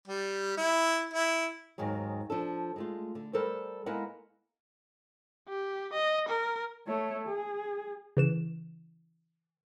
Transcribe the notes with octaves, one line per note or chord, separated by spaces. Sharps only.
G3
E4
E4
D#2 G#2 D#3 F#3 G#3
F3 D4 A4
G#3 A3 F4
D3
G3 A4 A#4 C5
G#3 A#3 B3 E4 D#5 F#5
G4
D#5
A#4
A3 C#5
G#4
C#3 E3 E7